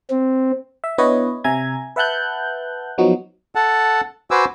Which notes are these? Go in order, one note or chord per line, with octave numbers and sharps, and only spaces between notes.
C4
E5
B3 D4 E4 B4 C#5 D#5
C3 E5 G#5 A#5 G#6
B4 E5 F#5 A5 F#6 G6
F3 F#3 B3 D#4 F#4
A4 F#5 A5
F#4 B4 C5 G#5 D6 E6